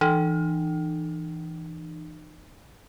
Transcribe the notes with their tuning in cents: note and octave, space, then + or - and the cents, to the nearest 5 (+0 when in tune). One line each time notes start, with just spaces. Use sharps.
E3 +0 D#4 -40